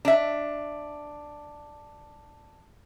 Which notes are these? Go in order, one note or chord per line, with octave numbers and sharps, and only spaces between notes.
D4 E5